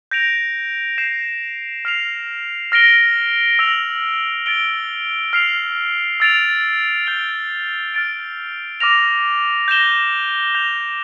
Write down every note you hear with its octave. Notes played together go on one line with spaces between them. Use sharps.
G6 A#6 D7 F7
G6 C7 E7
F6 C7 F7
F6 A#6 D7 G7
E6 A#6 F7
A6 D7 G7
F6 C7 F7
E6 A6 D7 F7
G6 D7 G7
F6 A6 D7
D6 F6 A#6 F7
G6 A#6 E7 G7
G6 A#6 F7